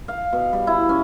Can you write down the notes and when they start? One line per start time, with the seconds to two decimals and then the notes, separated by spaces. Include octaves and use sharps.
0.08 F5
0.33 B2
0.53 G3
0.67 E4
0.89 C#4